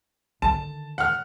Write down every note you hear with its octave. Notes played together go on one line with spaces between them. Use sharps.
D3 D#3 A5
F#5 F6